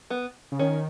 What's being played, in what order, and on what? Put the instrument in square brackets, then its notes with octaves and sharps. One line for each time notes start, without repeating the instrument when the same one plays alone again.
[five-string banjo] B3
[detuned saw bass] C#3
[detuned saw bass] D#3 [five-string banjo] C#4